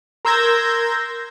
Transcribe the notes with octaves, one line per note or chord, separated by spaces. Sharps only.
A#4 C6 E6 G6 G#6 A#6